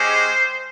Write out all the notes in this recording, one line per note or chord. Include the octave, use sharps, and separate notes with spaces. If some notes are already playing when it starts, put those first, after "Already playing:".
Already playing: G#3 C#4 G4 C5